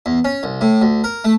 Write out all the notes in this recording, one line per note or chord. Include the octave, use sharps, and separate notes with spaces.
E2
C#4
C2
A2
D2
A#4
A3